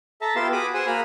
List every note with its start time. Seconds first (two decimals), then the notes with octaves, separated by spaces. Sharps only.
0.21 A4 E5 A5 A#5
0.36 B3 F4 G4 F5 C6 E6
0.52 F#4 G#4 B5 D6 D#6
0.74 G#4 C5 F#5 G#5 D#6 E6
0.87 A#3 F#4 G#4 B5 D#6 F6